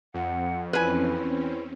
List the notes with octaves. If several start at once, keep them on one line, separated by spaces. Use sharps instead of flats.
F2 F#5
E2 C4 C#4 E4 B4 G#5